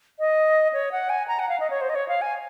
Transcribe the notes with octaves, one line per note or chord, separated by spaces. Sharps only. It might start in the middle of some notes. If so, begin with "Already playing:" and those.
D#5
C#5
F#5
G#5
A#5
F#5
F5
D#5
C#5
C5
D#5
C#5
F5
G#5